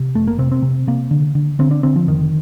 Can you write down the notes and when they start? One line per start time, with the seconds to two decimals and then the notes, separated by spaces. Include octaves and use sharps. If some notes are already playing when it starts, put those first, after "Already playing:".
Already playing: C3
0.15 F1 A3
0.27 A#3
0.38 C3 C4
0.51 C4
0.63 C3
0.87 C3 A#3
1.11 D3
1.35 D3
1.59 D3 C4
1.71 D4
1.83 D3 C4
1.96 F3
2.08 F1 D#3